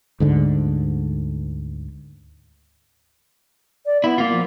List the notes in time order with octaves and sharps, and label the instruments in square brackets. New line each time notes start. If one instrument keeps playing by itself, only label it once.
[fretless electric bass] D2 G#2 D3
[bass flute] D5
[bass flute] B3 [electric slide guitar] E4
[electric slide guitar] A#3 F4
[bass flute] F3